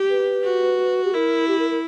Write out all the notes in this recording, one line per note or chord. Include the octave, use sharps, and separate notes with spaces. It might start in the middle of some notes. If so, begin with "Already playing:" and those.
Already playing: G4
B4
F#4
G4
E4 A#4
G4
A#4
A#4